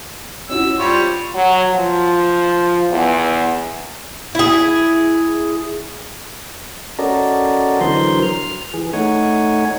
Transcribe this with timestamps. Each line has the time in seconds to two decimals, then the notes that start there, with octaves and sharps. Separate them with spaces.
0.49 C#4 E4 F#4 E6
0.79 G3 F4 C5 C#5
1.35 F#3
1.74 F3
2.90 E2
4.35 E4 G#4
6.99 C#4 F#4 A4 A#4 D5 D#5
7.81 D3 E3 F#3 A#4 C5 C6
8.23 F6
8.74 E3 G#4
8.93 A3 D#4 C#5 F#5 G#5